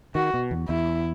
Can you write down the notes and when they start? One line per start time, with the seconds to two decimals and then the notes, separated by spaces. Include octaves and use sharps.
0.15 D#3 F#4
0.34 B2
0.51 E2
0.69 E2 E4